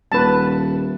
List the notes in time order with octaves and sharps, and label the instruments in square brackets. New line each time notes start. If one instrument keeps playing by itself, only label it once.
[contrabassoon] D#1 [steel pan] B4 A5